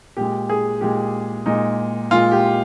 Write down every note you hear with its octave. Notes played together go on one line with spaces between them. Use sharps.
A#2 G#3 G4
G#4
A#2 G#3 G4
A#2 G#3 D#4
A#2 G#3 F4
G4